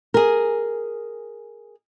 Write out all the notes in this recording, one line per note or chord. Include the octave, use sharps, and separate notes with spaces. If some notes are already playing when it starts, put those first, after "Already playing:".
G#4 A#4